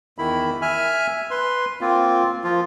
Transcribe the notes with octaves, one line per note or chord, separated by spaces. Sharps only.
E2 D#3 E4 B5
E5 G#5 F6
B4 C6
A#3 C4 F4
F3 F4